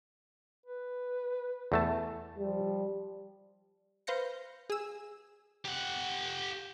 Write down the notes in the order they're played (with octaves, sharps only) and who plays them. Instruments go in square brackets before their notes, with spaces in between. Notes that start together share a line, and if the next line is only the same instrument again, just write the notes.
[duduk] B4
[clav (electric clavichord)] E2 A3 A5
[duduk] F3 [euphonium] G3
[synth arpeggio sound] B4 C5 F5 G6 A#6 C#7
G#4 E6
[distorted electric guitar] G4 F#5